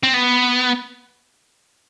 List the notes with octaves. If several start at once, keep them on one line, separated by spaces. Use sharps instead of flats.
C4
B3